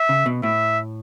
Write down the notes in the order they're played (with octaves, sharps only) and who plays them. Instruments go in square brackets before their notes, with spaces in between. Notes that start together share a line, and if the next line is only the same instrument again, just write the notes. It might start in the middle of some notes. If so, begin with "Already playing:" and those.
Already playing: [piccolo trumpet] E5
[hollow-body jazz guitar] C#3
B2
[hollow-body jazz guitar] A2 [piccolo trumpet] E5